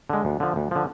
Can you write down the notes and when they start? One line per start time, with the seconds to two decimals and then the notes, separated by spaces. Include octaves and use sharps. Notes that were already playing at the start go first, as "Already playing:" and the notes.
0.10 D3 G#3
0.25 D2
0.40 D3 F3
0.56 D2
0.71 D3 F3